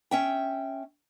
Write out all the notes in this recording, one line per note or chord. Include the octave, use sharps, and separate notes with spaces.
C#4 E5 G5